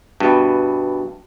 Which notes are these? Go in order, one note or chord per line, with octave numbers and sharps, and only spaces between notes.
G2 B2